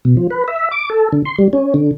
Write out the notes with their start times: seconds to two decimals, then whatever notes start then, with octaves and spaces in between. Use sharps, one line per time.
0.05 B2
0.17 F3
0.30 B4
0.48 E5
0.71 D6
0.90 A4
1.12 D3
1.25 C6
1.38 G3
1.53 C#4
1.74 D3